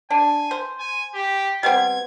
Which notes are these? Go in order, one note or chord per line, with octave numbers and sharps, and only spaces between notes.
D4 G#5
C5
G#5
G4
G3 B3 C4 G#6